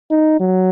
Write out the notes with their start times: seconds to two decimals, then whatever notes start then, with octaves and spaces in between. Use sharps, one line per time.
0.11 D#4
0.40 F#3